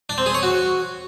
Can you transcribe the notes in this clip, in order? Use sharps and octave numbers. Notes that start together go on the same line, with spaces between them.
D4
C4
G#4
C#5
F#4